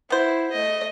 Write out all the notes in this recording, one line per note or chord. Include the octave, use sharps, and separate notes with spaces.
B3 E4 C5
A3 D#5